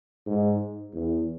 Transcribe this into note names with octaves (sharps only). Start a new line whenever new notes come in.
G#2
E2